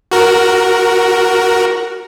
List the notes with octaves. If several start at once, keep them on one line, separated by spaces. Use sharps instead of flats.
F#4 A#4